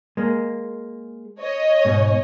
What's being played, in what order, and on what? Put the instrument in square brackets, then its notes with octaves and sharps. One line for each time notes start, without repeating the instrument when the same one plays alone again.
[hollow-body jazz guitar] G#3 A#3
[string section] C#5 D#5
[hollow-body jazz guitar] G#2 B2